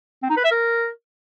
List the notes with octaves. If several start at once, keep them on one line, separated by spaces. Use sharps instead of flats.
C4
D#4
B4
E5
A#4